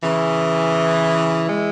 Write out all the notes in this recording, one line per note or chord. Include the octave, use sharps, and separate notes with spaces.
C#3 E3
E3 G#3